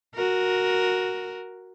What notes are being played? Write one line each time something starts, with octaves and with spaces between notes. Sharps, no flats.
F#4 A#4